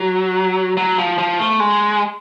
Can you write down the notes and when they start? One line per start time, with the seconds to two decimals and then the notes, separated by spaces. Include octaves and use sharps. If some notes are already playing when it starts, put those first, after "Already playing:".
Already playing: F#3
0.77 F#3
0.98 F3
1.18 F3
1.39 A3
1.60 G#3